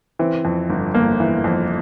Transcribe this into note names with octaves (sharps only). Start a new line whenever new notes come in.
E3 C4
F2
G1
G1 A#3
E3
F2